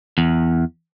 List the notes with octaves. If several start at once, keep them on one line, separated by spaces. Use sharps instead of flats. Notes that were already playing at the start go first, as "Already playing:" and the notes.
E2